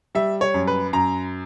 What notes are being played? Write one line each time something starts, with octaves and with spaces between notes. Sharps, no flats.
G3 E5
C#5
F#2
B4
F#2 A#5